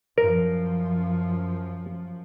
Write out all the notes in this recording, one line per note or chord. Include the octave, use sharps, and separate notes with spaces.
F#2 F3 A#4